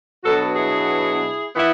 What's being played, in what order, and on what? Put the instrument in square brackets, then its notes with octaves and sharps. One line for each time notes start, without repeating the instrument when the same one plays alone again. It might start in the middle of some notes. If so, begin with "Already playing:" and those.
[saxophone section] B2 F#3 B3 D4 F#4 A4
E4 G#4
E3 B3 E4